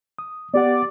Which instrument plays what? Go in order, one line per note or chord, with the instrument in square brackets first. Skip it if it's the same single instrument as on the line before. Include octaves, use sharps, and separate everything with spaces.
[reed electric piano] D#6
[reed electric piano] B3 G4 F#5 [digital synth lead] D5